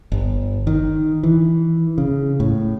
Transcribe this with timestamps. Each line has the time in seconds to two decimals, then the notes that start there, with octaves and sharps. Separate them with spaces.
0.12 G1
0.67 D#3
1.23 E3
1.98 C#3
2.40 A2